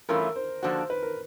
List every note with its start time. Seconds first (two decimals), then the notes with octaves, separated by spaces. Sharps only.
0.09 G2 E3 A3 C#4 F4 A#4
0.36 C5
0.63 D3 F3 A#3 D4 F#4 C5
0.90 B4
1.03 A#4